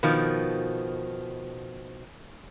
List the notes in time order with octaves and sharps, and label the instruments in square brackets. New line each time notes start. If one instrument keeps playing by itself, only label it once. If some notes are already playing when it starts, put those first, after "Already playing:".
[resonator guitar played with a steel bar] B2 D#3 F3